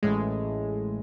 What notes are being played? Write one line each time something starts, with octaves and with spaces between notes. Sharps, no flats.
A1 A2 G#3